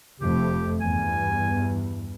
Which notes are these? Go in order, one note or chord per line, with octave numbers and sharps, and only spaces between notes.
F1 F2 A3 G4
E2 G2 G#5